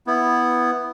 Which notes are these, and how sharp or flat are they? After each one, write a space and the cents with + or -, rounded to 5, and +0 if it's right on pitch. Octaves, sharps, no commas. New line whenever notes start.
B3 +0 E4 +0